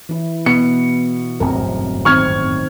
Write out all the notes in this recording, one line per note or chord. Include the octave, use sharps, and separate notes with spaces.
E3 E4
B2 C#7
D1 G1 F#2 C4 A#4
D#3 C4 C#6 F6 G#6